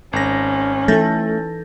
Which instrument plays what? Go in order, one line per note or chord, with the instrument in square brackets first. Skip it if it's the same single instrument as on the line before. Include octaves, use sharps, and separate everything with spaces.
[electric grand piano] G#1 A#6 [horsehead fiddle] C#4
[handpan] E3 D#4 A4 [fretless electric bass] A3 [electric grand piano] G6 A6 A#6